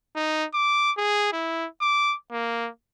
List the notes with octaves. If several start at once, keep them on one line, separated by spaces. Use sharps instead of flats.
D#4
D6
G#4
E4
D6
A#3